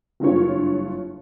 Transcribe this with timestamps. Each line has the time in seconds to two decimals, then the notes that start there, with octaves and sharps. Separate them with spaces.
0.20 F#1 G2 F4 C#5